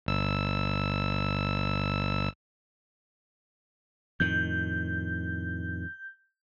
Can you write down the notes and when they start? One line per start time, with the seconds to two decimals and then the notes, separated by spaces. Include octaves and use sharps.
0.06 G1 E6
4.20 F2 A2 D#3 G6